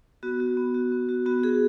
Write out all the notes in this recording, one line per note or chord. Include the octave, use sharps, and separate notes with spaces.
B3 F#4
F#4
B3
F#4
B3
F#4
B3 F#4
F#4 G#4